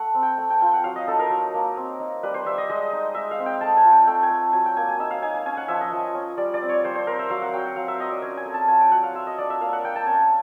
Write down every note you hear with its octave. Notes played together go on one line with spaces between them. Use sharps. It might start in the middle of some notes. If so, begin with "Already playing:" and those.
Already playing: A3 F#5
C4
G5
A3
G5
F4 G5
F#5
F#3 F5
D#5
D#4 A4
A#4
F#3
A#3
C4
D#4
G3 B4
C5
G3 E5
D#5
G#3 D#5
D#4
G#3 E5
F5
C4
G5
A3 A5
G#5
F4
G5
A3 G5
G#5
A3
F#3 G#5
G5
A#3 G#5
G#5
D#4 E5
F5
D#4 G#5
G#5
C#4 G#5
F#5
F3 E5
D#5
F3
C#4
G3 D5
D5
C4
C#5
G3 C5
C5
C4 A#4
E5
F#3 F5
F#5
F#3 G5
F#5
F#3 F5
E5
C4 D#5
D5
C#4 G#5
G#5
A3
A5
F4 G#5
G5
F#3 F#5
F5
F4 E5
D#5
D4 D5
E5
A#3 F5
F#5
A#3 G5
A5
C#4 G#5